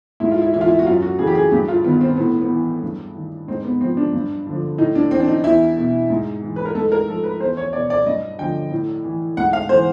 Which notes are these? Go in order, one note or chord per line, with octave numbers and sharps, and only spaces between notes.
G#2 E4
F4
E4
E3 E4
F4
E4
F#4
F#2 F4
F#4
C#3 E3 G#4
G4
G#4
G2 G4
F4
D#3 B3
C4
A2 B3
B3
E3
G2
D#3
G#2 C4
B3
F3 C4
D4
G2
D3 F3
A2 D#4
D4
E3 C4
D4
D#4
E2 E4
B2
G#2
E3
B4
A#4
G#2 A4
A#4
F3 A4
B4
E2 C5
C#5
B2 D5
D5
G2 D#5
D3 F3 G5
A2
E3
G#2 F#5
F5
E3 C5